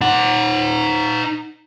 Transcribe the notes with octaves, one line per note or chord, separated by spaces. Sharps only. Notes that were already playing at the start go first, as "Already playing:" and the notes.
D#4 F#5